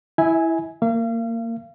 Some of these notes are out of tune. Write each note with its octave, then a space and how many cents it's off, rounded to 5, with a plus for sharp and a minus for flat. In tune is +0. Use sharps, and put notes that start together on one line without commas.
E4 +0 E5 -35 G#5 +0
A#3 -20 F5 -35